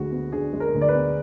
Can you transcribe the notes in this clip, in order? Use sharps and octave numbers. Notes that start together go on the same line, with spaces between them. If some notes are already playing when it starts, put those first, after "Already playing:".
Already playing: D2 D3 G#3 F#4
B3
D3 G#4
G#3
A#4
D2
D5
B4
B3